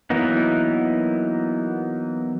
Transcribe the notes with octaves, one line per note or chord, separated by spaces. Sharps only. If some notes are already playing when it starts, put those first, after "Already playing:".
E3 F#3 A#3 B3 D#4